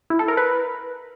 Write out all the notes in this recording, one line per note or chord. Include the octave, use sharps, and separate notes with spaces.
E4
A4
A#4
B4